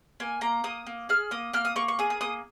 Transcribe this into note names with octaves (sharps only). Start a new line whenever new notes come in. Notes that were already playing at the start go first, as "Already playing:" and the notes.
A#3 G#5
A#3 A#5
A#3 D#6
A#3
G#4 F6
A#3 D#6
A#3 F6
D#6
A#3 C#6
C#6
G#4 D#6
D#6
A#3 D#6